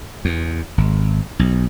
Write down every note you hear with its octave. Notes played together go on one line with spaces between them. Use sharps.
E2
G#1
B1